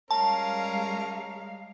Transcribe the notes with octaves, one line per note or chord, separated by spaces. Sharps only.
G3 G#3 C#4 A#4 F5 A5 A#5